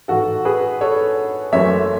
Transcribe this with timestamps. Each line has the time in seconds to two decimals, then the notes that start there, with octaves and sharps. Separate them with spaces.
0.08 A1 G#2 E3 F#4 A4
0.45 G#4 B4
0.81 A4 C#5
1.52 F#1 F#2 E3 A3 C#5 E5